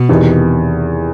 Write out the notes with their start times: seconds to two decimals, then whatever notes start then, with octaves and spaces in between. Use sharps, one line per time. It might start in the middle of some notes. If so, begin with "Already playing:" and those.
Already playing: B2
0.09 E2 C3 D#3